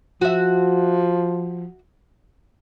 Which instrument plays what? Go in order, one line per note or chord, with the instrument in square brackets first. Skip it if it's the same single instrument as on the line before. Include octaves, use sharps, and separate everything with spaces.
[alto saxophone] F3 [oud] F#4 E5